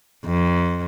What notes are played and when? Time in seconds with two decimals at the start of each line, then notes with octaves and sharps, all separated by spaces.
0.25 F2